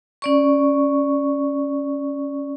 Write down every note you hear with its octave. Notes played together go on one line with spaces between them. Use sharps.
C#4 D5 C#6